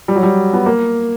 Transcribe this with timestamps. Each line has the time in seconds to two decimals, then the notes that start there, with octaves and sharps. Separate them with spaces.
0.08 G3
0.16 F#3
0.23 G3
0.53 B3
0.66 A#3